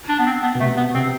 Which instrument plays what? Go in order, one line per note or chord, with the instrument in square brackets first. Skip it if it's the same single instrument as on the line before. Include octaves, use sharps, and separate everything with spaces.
[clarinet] D4
B3
C4
B3
[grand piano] B2
[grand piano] C3 [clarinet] A3
[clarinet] B3
[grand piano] C3 [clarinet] C4